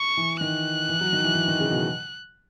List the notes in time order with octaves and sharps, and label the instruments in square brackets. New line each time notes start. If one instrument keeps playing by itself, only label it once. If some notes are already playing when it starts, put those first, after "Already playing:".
Already playing: [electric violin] C#6
[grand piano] E3
[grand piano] D#3 [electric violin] F#6
[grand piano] E3
F#3
D#3
E3
E3
D#3
C#3
B2